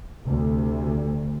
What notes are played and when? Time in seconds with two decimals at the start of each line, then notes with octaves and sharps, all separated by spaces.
0.23 D2 C3